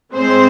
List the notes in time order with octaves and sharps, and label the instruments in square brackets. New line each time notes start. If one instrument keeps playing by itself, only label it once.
[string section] A2 G#3 C4 C5